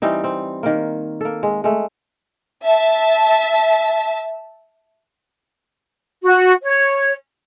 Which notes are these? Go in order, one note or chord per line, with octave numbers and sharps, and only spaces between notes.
E3 G3 C4 D#4
C4
D#3 A#3
A#3 A4
G#3
G#3 A3
E5 A5
F#4
C#5